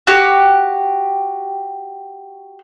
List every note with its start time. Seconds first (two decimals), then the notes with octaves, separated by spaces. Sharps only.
0.07 F#4 G4